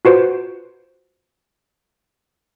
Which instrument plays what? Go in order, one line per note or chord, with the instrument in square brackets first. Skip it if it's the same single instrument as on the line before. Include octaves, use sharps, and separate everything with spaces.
[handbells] F4 F#4 B4 C5